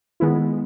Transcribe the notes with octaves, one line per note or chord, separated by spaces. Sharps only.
D#3 G#3 B3 E4